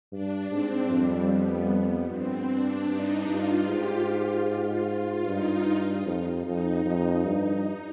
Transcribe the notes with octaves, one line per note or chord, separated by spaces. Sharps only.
G2 D4
G#2 C4
F2 G3
B3
G2 C4
D4
G2 D#4
G2 F4
G#2 G4
F4
F4
G2 D#4
F2
F2 D#4
F2
G2 D#4